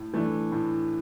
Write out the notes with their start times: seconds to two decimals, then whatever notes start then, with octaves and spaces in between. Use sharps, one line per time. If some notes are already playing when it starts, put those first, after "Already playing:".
Already playing: A2
0.14 E3 A3 D4
0.52 A2